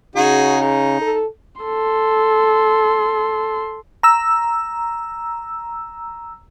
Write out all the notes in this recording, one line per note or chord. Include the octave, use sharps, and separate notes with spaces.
C#3 D#4 F#4 G#4
D#4
A4
A4 C6
A#5 E6